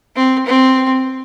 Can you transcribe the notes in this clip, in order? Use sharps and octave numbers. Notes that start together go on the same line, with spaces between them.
C4
C4